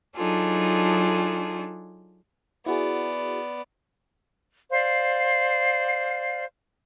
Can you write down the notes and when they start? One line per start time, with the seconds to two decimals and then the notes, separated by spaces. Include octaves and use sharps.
0.16 F#3 D4 D#4 F4 G#4 A4
2.66 B3 E4 F#4 G#4 D5
4.71 C5 D5 F5